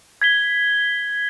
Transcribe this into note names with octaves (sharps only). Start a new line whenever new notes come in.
G#6 B6 G7